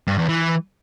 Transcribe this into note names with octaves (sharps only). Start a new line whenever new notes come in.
G2
E2
E3